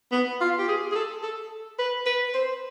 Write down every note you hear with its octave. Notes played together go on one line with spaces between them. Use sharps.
B3
F4
G4
G#4
G#4
A4
A4
B4
B4
C5